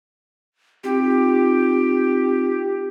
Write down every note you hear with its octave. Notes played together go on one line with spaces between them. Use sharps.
C4 D#4 F4 G4